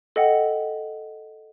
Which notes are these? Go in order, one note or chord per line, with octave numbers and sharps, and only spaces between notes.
A4 D#5 F#5 G5